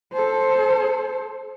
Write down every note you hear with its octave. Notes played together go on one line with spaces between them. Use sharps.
A4 C5